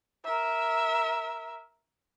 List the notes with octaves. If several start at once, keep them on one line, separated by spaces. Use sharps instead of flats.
A#4 E5